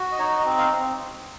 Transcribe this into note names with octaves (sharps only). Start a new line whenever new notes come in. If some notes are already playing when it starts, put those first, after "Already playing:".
Already playing: F#4
D#5
D#4 C#5
D#5
C4
F5
C4